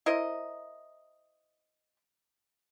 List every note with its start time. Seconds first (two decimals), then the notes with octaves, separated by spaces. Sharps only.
0.06 E4 A#4 C5 D#5